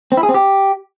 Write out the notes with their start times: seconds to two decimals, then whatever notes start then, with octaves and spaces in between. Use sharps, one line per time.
0.12 C4
0.17 E4
0.23 G#4
0.29 C4
0.34 G4